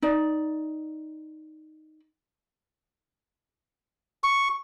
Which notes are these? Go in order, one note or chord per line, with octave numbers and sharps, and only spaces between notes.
D#4 D5
C#6